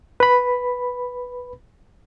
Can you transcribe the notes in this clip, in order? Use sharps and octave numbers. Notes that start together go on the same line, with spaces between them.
B4 B5